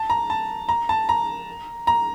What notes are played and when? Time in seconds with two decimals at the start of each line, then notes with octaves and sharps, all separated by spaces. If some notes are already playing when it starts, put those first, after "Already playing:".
Already playing: A5
0.10 A#5
0.30 A5
0.69 A#5
0.89 A5
1.09 A#5
1.87 A#5